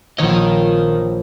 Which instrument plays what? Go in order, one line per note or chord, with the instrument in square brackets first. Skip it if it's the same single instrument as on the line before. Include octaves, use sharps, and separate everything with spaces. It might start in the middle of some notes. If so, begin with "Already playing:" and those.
[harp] A#1 C#5 [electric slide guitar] D#3 D#5